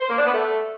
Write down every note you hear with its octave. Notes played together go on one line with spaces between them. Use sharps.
C5
A#3
D4
B3
A3